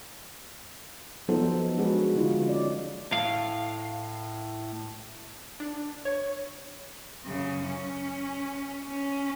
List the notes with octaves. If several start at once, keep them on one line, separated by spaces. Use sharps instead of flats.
F3 F#3 B3 D#4 A4 C5
G#3 D4 F#4 G#4 A#4 B4
D3 A3 D#4 F4
C#4 D5
A2 F5
D4
C#5
F#2 C#3
C#4
C#4